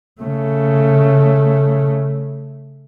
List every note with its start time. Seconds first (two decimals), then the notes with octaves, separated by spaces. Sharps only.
0.21 C#3 A3